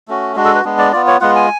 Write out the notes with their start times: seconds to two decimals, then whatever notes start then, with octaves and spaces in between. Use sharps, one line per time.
0.08 A3 C#4 F#4
0.36 G#3 D4 F#4
0.45 A4
0.55 B4
0.64 G#3 B3 D4
0.78 D5
0.92 B3 F4 D5
1.07 C#5
1.21 G#3 B3 F4 F#5
1.36 G#5